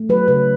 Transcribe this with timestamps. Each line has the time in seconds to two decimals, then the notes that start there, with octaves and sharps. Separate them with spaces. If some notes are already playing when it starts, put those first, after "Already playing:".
Already playing: A3
0.09 F#3 B4
0.28 C#3 B4